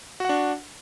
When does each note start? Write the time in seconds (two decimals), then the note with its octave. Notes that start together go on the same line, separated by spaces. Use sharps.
0.20 F#4
0.25 F#5
0.29 D4